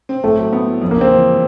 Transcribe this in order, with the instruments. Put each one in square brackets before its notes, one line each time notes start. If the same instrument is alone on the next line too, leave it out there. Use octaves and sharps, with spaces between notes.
[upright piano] C4
[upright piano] A2 [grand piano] A3
[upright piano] F#3
B3
E4
F2
[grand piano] A#3
[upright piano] C#3 [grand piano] C4
[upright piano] E3
G3